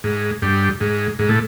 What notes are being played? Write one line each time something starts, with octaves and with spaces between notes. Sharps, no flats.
G#2
G2
G#2
G#2
A2